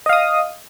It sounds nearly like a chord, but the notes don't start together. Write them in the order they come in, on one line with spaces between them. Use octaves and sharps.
D#5 F5 D#6